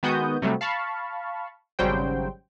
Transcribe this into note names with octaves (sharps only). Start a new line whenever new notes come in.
D#3 G#3 B3 F#4 D#6 G6
C3 F#3 G3 A3
F5 A5 B5 C#6
G#1 C#3 F#3 G3 C5 G5